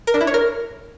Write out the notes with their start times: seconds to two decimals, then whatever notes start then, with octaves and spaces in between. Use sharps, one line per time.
0.07 A#4
0.14 D4
0.21 E4
0.27 C#5
0.34 A#4